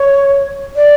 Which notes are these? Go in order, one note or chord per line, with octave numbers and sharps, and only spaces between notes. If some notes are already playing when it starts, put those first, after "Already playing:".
Already playing: C#5
D5